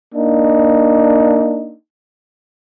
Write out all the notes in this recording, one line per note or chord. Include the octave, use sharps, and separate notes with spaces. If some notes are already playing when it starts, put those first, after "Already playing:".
A#3 D4 D#4